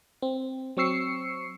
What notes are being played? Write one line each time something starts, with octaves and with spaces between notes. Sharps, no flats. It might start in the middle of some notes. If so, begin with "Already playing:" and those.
C4
F#3 C4 C#6 E6 C7 C#7